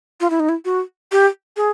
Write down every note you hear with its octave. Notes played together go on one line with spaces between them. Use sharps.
F4
E4
D#4
E4
F#4
G4
G#4